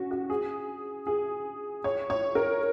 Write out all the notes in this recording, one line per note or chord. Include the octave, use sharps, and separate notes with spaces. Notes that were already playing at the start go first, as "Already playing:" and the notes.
Already playing: C#4 F#4
F#4
G#4
G#4
C#5
C#5
A#4